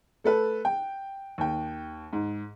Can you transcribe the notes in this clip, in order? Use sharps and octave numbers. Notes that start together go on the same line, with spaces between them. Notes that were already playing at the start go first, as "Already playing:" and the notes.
A3 A4 B4
G5
D#2 G5
G#2